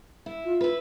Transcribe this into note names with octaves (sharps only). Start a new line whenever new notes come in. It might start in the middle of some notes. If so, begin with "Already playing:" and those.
E4
F4
E4 B4